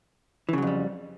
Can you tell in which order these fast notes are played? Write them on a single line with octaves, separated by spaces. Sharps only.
E3 C#3 F#3 F2 G3